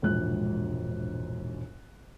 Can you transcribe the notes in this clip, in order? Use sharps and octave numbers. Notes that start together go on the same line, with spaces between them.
E1 A#1 G#2 F#6